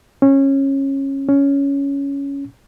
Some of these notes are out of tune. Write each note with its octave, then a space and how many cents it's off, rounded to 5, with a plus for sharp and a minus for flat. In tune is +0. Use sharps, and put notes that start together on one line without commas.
C#4 -20
C#4 +10